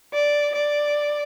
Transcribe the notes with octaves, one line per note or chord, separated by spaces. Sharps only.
D5
D5